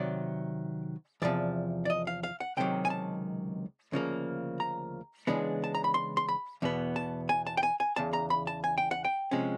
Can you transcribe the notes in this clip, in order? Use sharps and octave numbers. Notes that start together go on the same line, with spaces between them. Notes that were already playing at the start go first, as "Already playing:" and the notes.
Already playing: C3 D#3 F#3 D5
E2 C3 F3 D5
D5
D#5
F5
F5
F#5
C#2 C3 D#3 F#3 G5
G#5
A5
D2 C#3 F3 A#3
A#5
C#3 E3 G#3 B3 D4
A5
A#5
B5
C6
C6
B5
E2 B2 B3
A5
G#5
A5
G5
G#5
G#5
E2 C#3 A5
A#5
B5
A5
G#5
G5
F#5
G5
C3 F3 G#3 C#4